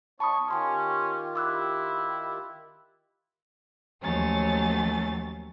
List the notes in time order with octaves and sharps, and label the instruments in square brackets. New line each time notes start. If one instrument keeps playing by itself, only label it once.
[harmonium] B3 D#4 C#5 [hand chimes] A5 B5 D#6 [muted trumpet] C#6
[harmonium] D#3 F4 G4 [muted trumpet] C#4 [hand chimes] G#5 C6 C#6
[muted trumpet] E4 [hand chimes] D6 E6 F#6
[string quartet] D#2 F3 F#3 A3 C#4 A6